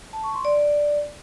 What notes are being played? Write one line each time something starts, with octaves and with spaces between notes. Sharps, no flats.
A5
C#6
C6
D5